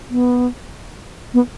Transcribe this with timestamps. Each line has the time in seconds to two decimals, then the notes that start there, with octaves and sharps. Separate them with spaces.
0.10 B3
1.34 B3